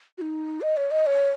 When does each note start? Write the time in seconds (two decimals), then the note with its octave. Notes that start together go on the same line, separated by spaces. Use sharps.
0.18 F#4
0.21 D#4
0.61 D#5
0.77 C#5
0.91 D#5
1.06 C#5